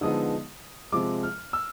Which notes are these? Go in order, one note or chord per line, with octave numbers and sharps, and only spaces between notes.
D3 F3 G#3 B3 D#4 D#6
C3 F3 G#3 D6
F6
E6